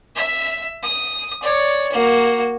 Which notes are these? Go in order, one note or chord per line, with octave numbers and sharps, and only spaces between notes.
E5
D#6
C#5 D5
A#3 F#4